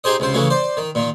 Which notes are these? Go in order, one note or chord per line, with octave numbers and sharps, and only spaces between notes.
D#4 G4 G#4 C5 D#5
C#2 C3 C5
C#3 E3 A3 F#4
C5 D5
D#3
A#2 D#3